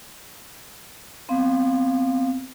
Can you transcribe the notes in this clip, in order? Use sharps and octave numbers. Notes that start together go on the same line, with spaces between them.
B3 C4 F5